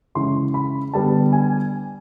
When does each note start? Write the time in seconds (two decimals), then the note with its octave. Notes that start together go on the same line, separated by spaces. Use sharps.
0.15 C#3 E3 G#3 C#4 C6
0.54 B5
0.94 D3 G3 B3 D4 A5
1.33 G#5